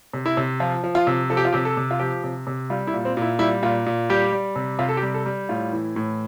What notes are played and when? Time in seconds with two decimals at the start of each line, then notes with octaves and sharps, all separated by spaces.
0.13 C3
0.26 E4
0.37 C3
0.60 F3 F4
0.84 F3
0.95 F4
1.07 C3
1.30 F3 A4
1.37 G4
1.45 F4
1.53 C3 G4
1.65 A4
1.77 C3
1.91 F4
2.00 F3 G4
2.24 C3
2.47 C3
2.70 G3 F4
2.87 E4
2.94 A#2
3.05 C4
3.17 A#2 E4
3.39 G3 E4
3.63 A#2 F4
3.86 A#2
4.10 G3 G4
4.32 G3
4.56 C3
4.79 C3 F4
4.89 A4
4.97 G4
5.03 G3
5.14 A4
5.26 G3
5.49 A2 F4
5.73 E3
5.96 A2